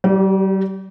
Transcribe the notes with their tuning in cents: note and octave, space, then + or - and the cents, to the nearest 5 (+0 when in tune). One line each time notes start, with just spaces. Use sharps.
G3 -40 G4 +5 D5 +0